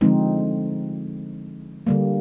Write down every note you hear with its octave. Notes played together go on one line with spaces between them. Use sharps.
D3 F3 G#3 C4 D#4
D3 G3 A#3